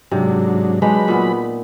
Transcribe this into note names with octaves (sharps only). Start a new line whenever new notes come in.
G#2 C3 F#3 D4
F#3 G#3 D4 D#4 B4 B5
A#2 B3